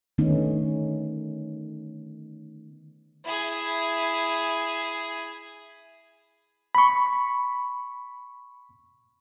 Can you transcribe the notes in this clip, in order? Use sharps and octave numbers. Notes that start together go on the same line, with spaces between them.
D3 D#3 A3 B3 C#4 D#4
E4 G#4
B5 C#6